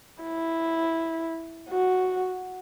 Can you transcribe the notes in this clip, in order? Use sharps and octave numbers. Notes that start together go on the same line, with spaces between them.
E4
F#4